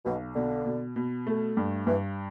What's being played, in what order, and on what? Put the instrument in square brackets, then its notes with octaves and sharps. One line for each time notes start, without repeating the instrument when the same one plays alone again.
[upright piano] B1 [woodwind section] B2
[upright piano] B2 [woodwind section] D3
[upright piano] B2
B2
A3
G2
[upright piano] G2 [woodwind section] E3